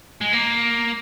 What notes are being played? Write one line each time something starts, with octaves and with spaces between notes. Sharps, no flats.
G#3
A#3